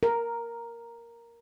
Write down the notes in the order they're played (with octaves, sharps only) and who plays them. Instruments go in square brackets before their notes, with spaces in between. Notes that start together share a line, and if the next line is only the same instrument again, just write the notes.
[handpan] A#4